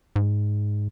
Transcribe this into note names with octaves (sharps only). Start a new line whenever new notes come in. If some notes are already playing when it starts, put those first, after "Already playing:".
G#2